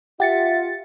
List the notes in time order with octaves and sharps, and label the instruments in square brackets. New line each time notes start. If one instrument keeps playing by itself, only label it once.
[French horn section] F4 [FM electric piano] G4 A6 C#7 [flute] E5 [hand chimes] F#5